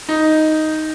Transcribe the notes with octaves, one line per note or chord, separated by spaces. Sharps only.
D#4